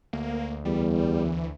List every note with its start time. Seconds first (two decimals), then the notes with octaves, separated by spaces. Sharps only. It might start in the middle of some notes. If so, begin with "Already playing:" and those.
0.13 D2 A#3
0.65 E2 G3
1.25 E3